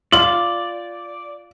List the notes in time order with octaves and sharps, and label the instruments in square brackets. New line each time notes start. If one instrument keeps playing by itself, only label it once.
[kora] F4 [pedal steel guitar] D5 [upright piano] F#7